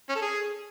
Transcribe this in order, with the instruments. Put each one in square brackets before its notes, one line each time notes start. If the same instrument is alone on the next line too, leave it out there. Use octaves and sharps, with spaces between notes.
[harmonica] C#4
A4
G#4